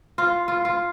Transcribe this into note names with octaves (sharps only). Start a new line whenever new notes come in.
F4
F4
F4